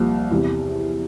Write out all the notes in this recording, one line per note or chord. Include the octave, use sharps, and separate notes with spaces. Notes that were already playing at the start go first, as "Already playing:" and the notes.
Already playing: C2 A#2 F3 A#3
E2 C3 G3